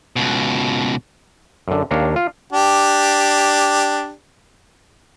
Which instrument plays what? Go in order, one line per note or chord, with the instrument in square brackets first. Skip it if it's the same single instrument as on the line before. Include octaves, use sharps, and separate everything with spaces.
[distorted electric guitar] C#2 B2
[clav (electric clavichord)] F#2 D3
D#2 D4 C#5 F5 A#5
F4
[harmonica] D4 G4